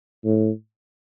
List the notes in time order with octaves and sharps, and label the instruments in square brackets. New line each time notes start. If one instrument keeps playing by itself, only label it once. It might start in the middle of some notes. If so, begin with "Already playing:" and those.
[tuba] A2